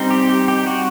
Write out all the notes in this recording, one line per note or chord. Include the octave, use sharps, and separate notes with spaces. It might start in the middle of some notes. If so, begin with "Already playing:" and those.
Already playing: G3 C4 D#4
G4
G4
G4
F#4